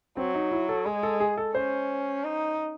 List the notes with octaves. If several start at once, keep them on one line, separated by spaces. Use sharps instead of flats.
F#3 C4
D#4
E4
A4
G#3 G#4
A4
G#4
A4
C#4 C5
D#4